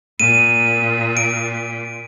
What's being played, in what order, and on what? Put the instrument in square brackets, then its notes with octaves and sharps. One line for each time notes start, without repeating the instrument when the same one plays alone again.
[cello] A#2 [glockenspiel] D#7
[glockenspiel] D7